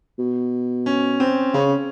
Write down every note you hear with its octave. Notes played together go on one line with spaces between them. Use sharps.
B2
C#4
C4
C#3 C#4